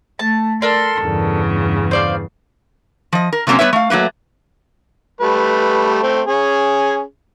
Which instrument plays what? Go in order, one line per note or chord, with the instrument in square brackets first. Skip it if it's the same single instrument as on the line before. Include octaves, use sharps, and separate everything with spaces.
[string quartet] A3 [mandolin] A5
[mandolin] A4 A#4 D5 [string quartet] C6
[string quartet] E2 G2 C#3
[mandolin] C5 D5 F5
[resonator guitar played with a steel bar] F3 D#5
A#4
C3 F#3 A#3 C4 C#4
G3 B3 C#4 B4 C#5 E5
A3 F5
F#3 A3 A#3 B4
[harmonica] G3 A3 B4
A3 C4
C#4 G#4